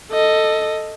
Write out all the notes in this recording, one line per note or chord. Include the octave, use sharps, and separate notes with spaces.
A4 D#5